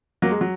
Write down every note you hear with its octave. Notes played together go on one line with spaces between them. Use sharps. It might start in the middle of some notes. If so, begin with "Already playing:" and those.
F#3 A#3
G#3
F#3